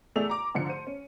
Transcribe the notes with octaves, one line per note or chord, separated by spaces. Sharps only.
E2 A3 G#4 D5 E6 F7
A#5 D6
G#2 D3 F3 C#7
C5 D#7
C#4